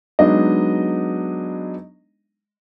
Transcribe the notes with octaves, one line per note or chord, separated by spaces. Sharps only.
F#3 G#3 B3 D4 D#4 D#5